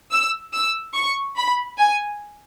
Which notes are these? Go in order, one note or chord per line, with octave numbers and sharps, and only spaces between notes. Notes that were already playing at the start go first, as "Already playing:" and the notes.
E6
E6
C#6
B5
G#5